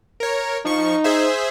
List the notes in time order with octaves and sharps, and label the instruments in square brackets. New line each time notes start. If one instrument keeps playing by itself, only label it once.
[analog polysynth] A#4 C#5
[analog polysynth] F3 C#6 [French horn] D#4
[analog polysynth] G#4 C5 E5